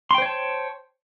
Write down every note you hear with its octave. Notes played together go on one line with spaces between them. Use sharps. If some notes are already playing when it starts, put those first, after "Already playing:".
C5 C#5 G5 A5 C6